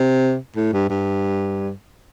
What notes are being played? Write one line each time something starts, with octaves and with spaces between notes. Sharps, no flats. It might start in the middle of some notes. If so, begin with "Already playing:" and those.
Already playing: C3
A2
G2
G2